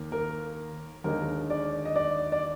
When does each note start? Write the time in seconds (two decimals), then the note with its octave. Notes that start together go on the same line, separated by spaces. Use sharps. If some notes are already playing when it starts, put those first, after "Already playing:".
Already playing: D#2 A#3
0.12 A#4
1.04 D#2 D3 G#3 D#4 A#4
1.50 D5
1.85 D#5
1.96 D5
2.32 D5